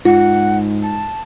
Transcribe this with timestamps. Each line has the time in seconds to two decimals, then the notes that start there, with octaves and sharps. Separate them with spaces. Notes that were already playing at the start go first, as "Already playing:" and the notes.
0.05 G#2 F4 F#5
0.83 A5